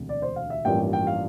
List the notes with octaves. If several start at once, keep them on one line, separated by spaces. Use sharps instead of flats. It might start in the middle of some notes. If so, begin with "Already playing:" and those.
Already playing: E1 D2 C3
D5
C5
F5
E5
A1 G2 F3 A#3 G5
G5
F5